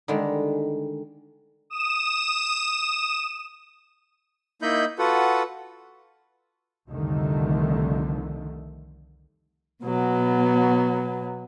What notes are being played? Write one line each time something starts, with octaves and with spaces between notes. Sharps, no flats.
D3 D#3 G3 G#3
D#6 E7
A#3 D#4 E4 D#5 B5 G6
F4 F#4 A4 B4 F#5
C2 F2 D3 D#3 A3
B2 F#3 B3